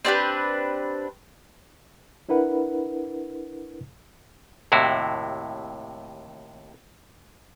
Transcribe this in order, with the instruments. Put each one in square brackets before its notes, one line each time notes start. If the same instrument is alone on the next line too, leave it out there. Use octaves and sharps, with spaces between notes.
[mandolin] C4 D4 G4 B4
[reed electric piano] D4 E4 A#4 B4 F#5
[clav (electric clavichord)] D#2 A2 C3 E4 F#4